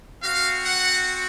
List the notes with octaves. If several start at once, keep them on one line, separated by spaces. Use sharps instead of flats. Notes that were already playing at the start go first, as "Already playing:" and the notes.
C4 F#4 F5
F#5